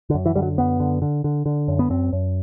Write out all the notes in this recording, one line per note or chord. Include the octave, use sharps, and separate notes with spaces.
D3
F#2
E3
D3 G3
F#3
F#2 B3
D3
D3
D3
D3
F#2
B3
F#2 C4
F#2